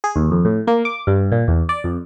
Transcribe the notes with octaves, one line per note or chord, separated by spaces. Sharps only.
G#4
D#2
F2
A2
A#3
D6
G2
A#2
E2
D5
F2